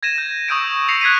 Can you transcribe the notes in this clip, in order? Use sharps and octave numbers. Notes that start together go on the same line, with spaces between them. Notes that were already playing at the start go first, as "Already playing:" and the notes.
G#6 A#6 D#7 E7
G6
C#6 D#6 E6 G6 A#6 D7
A#6 C7 C#7 F7
F#6 G#6 B6 C7 D#7